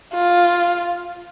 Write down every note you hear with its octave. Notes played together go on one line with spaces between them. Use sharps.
F4